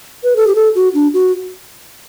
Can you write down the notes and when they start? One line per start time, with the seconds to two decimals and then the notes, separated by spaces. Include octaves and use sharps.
0.24 B4
0.36 A4
0.47 G4
0.55 A4
0.75 F#4
0.94 D4
1.14 F#4